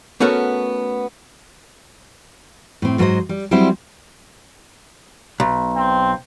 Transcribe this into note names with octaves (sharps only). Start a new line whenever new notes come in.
A3 B3 C#4 F#4 A4 A#4
A2 C4
G#2 F#3 F4 B4 C5 D#5
G3
F#3 G3 C4 E4 C5
B1
C4